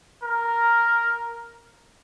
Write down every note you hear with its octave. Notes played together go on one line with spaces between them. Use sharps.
A#4